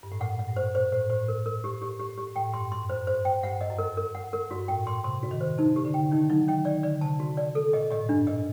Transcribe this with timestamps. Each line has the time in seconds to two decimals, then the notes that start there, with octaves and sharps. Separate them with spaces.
0.03 G2
0.12 A2
0.20 A#2 F#5
0.39 F#5
0.48 G2
0.56 C5
0.74 A#2 C5
0.92 A2 C5
1.10 A2 C5
1.28 A#4
1.46 A#4
1.64 G4
1.82 G4
2.00 G4
2.18 G4
2.36 A2 G5
2.53 G2 C6
2.72 F#2 C6
2.89 F#2 C5
3.07 G2 C5
3.25 G5
3.43 G2 F#5
3.61 D#5
3.70 F#2
3.78 A#4
3.97 A#4
4.15 F#5
4.33 A#4
4.50 G2 F#4
4.68 A2 G5
4.86 A#2 C6
5.04 C3 C6
5.23 F#4
5.31 D#3
5.41 C5
5.58 C3 D#4
5.76 G4
5.85 D3
5.94 G5
6.12 D#3 D#4
6.30 F#3 D#4
6.48 D#3 G5
6.65 D#3 D5
6.83 D3 D5
7.01 C3 A5
7.20 F#4
7.37 D5
7.55 A4
7.73 A#2 D#5
7.91 A2 D#5
8.09 G2 D4
8.27 A#2 D#5